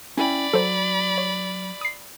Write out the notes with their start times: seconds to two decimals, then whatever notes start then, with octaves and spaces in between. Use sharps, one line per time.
0.17 C#4 E4 D5 G5 B5
0.53 F#3 A4 C5
1.18 C#5
1.81 D#6 C7